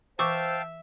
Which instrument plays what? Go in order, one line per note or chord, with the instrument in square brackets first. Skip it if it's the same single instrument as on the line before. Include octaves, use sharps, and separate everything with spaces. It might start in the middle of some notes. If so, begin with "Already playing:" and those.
[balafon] E3 C#6 D6 [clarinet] C5 [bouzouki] E5 [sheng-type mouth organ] F5 G5 A5